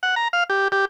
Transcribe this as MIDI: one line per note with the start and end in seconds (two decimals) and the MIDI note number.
0.03 0.15 78
0.16 0.28 82
0.33 0.44 77
0.50 0.68 67
0.72 0.85 67